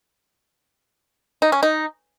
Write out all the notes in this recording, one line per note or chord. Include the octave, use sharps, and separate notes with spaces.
D#4
C#4
D#4